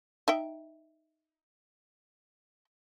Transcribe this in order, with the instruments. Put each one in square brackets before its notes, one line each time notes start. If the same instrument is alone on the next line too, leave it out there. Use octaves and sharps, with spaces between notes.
[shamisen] D#4 E5 G5